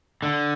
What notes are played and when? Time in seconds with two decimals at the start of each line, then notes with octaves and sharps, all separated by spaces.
0.22 D3